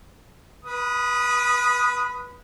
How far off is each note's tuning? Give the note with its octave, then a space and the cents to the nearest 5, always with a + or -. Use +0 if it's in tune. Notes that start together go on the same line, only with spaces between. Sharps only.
B4 -25 B5 +15 D#6 +0